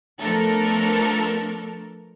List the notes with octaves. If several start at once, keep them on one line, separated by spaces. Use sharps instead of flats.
F3 A3 B3 D4 A4 A#4